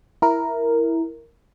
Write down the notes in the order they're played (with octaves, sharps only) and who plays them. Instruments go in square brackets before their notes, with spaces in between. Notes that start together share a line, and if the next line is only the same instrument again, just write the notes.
[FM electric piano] E4 A#4